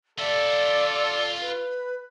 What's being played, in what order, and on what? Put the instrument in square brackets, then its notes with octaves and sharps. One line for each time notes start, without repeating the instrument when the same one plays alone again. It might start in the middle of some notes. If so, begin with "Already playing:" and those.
[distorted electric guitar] F4 E5 [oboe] A4 [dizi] D5
[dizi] B4